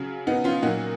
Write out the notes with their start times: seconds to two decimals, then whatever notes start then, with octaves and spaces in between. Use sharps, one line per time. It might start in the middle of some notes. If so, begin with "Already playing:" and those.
Already playing: C#3 F#3
0.27 B3 D#4
0.44 C#4 F4
0.62 A#2 F#3 D#4 F#4